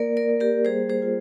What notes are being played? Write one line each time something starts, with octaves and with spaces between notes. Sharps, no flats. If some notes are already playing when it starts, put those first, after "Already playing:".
Already playing: A#3 A#4 D5
A#4 D5
A#3
G4 A#4
G3 G#4 C5
G#4 C5
F4